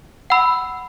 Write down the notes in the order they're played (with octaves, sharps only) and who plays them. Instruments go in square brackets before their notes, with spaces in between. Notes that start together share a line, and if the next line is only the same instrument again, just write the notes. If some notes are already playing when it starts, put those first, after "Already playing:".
[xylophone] F#5 B5 E6